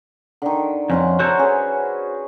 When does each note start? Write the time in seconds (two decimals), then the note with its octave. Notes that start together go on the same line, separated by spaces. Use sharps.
0.42 D3 D#3
0.90 F2 C#4 C5 F#5
1.20 F#4 A4 C5 C#5 A#5
1.39 C#4 G#4 B4